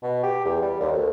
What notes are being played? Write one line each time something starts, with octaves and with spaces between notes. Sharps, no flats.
B2
G4
E2
G3
D#2
D2